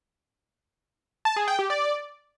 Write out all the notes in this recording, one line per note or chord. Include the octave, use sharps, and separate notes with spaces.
A5
G#4
G5
G4
D5